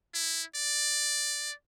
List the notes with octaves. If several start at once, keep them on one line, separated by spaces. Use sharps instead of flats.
E4
D5